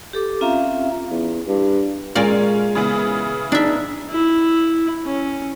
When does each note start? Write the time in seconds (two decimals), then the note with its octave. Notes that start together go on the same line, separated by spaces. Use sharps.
0.13 G4 A4 D6
0.41 C4 C#4 F4 E5 F5 A#5
1.11 E2
1.47 G2
2.15 A#2 G#3 C#4 F4 A#4 D5
2.75 C#3 E3 B3
3.52 D4 D#4 E5
4.11 E4
5.05 C#4